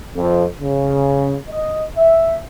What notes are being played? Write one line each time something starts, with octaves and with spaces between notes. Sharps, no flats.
F2
C#3
D#5
E5